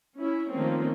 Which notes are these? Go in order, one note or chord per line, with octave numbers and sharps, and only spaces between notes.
C#4 E4
D#3 F3 A3 A#3 C4 C#4